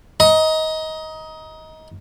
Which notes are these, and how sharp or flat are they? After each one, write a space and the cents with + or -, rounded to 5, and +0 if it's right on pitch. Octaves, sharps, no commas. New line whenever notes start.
D#5 +20 A#5 +20